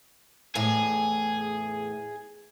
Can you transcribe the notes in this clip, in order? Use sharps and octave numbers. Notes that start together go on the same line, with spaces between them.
E2 A2 G#4